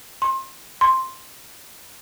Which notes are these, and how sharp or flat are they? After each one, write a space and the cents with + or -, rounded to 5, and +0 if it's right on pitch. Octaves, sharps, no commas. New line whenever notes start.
C6 +25
C6 +5